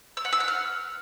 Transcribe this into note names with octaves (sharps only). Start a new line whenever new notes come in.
E6
F#5
E6
F#5
F6